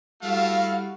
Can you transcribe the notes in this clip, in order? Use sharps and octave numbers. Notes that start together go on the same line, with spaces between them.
G3 A3 E4 F#4 A4 F5